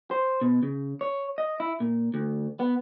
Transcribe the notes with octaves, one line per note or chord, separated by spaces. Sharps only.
C5
B2
C#3
C#5
D#5
E4
A#2
D2
B3